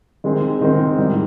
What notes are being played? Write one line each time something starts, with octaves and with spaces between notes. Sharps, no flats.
D#3 G#3 C4
D#3 G#3 C4
G#2 D#3 G3